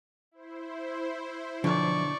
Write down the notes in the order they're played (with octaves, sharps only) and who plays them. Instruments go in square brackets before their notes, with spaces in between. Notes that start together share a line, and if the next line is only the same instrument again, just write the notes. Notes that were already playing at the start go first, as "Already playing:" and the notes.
[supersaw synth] E4 C5
[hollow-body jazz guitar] B1 D3 [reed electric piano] F3 [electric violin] D5 C#6